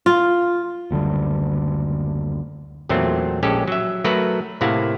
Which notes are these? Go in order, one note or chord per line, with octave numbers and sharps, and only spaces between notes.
F4
F#1 D2 D3 G3
E2 A#2 F#3 A3 C4
A#1 G#3 C#4 G4 A4
F#3 E5
F#3 A3 F#4 A#4 B4
A2 C3 A#3 E4 F5 F#5